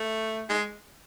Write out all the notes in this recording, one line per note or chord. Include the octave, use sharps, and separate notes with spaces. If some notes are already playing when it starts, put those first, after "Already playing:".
Already playing: A3
G#3